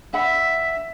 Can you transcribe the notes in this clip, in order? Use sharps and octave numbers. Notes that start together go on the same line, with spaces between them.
D4 E5 F#5 B5